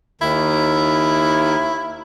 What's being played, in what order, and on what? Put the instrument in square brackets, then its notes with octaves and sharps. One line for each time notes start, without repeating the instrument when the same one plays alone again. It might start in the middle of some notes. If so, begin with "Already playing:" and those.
[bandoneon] D#2 D#3 [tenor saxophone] E4